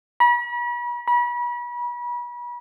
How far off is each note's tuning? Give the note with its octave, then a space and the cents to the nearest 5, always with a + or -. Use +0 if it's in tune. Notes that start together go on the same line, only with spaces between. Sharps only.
B5 -40
B5 -35